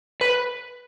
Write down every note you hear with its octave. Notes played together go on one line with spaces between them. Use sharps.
B4